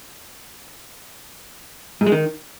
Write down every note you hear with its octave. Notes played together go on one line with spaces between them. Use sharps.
G#2
G#3
D#3